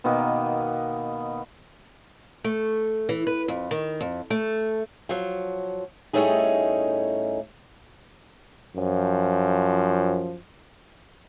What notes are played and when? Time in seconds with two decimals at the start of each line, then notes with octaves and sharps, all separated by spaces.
0.04 B2 D#3 A#3 B3
2.44 A3
3.09 E3
3.27 B4
3.48 F2
3.71 D#3
4.01 F2
4.30 A3
5.09 F3 F#3
6.13 A2 G3 A3 C#4 D#4 G#4
8.76 F#2 F3